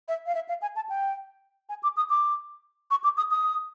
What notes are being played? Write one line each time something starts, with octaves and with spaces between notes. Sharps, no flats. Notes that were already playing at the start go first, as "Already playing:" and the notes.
E5
F5
E5
F5
G#5
A5
G5
G#5
D6
D#6
D6
C#6
D6
D#6
D#6